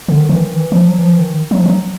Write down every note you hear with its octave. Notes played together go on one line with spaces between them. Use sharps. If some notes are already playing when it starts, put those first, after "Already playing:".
D3
D#3
E3
D#3
E3
F3
F#3
E3
F3
E3
D#3
F#3
F3
F#3